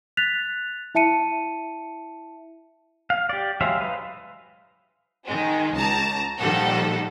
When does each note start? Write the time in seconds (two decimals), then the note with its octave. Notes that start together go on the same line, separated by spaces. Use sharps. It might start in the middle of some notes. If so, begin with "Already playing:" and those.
0.17 F#6 A6 B6 F7
0.95 E4 E5 A5 C#7 D#7
3.10 F5
3.29 G4 D5
3.61 F#3 G#3 C5 E5 F5
3.80 D#4 B4 F5
5.27 D#3 G#3
5.75 C#2 A5 A#5
6.39 A#2 D#3 F3 G3 A4 F#5